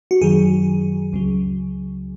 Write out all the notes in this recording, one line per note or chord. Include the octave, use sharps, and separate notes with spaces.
F#4
F#2 D#3 F#3 G#4
C#2 C#3 F#3